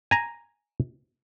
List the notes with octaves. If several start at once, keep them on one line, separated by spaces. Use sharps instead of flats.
G#5 A#5